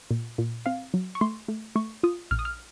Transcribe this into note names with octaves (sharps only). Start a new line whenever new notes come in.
A#2
A#2
C4 F5
F#3
C#6
A3 C6
A3
A3 C#6
F4 D#6
A#1 F6
D#6
F6